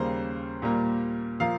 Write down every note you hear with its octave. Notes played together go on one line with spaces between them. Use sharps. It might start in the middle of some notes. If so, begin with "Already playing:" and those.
Already playing: D#2 C#3 G3 A#3 C5
A#2 G3 A#3
A#2 F3 A#3 F5